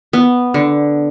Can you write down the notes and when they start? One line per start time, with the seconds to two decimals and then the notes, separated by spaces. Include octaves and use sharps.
0.13 B3
0.54 D3